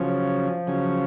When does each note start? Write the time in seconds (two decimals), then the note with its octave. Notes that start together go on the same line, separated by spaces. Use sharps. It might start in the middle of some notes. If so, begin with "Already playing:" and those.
Already playing: C#3 F3 F#3 C#4
0.67 C#3 F#3 C#4